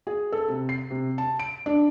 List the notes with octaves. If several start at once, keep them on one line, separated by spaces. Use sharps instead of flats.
G#4
A4
C3
C7
C3
A5
D7
D4